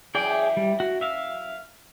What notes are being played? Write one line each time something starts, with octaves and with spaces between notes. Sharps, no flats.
F#2 E3 G#4 D5 G5
G3
F#4
E5 F5